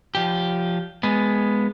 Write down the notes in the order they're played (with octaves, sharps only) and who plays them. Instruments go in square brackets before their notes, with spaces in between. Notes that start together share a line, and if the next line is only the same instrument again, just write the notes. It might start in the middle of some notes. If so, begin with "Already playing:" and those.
[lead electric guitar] F3 G4
G#3 B3